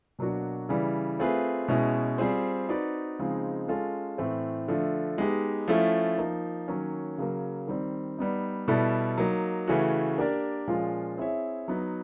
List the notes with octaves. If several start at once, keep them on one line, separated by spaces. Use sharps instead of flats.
B2 F#3 A#3 D4 F#4
C#3 E3 G3
A3 C4 F4 G#4 B4
B2 G#3 C#4 E4
G3 C4 F4 G#4 C5
C4 D#4 F#4 B4 D5
C#3 F3 G#3 C4 D#4
G#3 C#4 F4 A4
A2 E3 A3 C4
D3 F3 A3
G#3 B3 D#4 G4
F3 A3 C#4 E4
F3 A#3 D#4
D#3 F#3 A#3 C#4
C#3 F#3 A#3
D#3 G3 C4
G3 B3 D#4
B2 G3 B3 E4 A4
F#3 A#3 D#4
C#3 E3 A3 C#4 F#4
A#3 D4 G4 A#4 D5
A#2 F3 G#3 C#4 F4
C4 E4 G#4 C#5 E5
F#3 B3 D#4